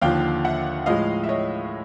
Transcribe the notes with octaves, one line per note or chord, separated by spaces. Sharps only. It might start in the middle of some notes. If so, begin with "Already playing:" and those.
D#2 D3 F3 F5 G5
E5 F#5
A2 F3 G#3 D#5 F5
E5
C#5 D#5